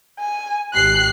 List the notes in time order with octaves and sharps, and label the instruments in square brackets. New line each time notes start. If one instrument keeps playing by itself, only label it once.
[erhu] G#5
[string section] G#1 G4 C7 [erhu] F#6